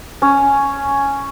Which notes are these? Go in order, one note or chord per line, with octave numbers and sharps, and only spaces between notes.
C#4